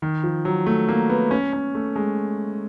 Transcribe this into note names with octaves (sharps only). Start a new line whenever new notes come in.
D#3
F3
F#3
A3
A#3
B3
C#4
C#4
A3
G#3